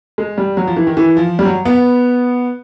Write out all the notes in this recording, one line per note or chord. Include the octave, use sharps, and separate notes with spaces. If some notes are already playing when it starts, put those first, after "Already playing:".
G#3
G3
F#3
F3
E3
D#3
E3
F3
G3
F#3
B3